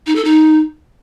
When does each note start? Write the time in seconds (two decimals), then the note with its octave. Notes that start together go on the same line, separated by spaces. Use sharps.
0.06 D#4
0.16 A4
0.25 D#4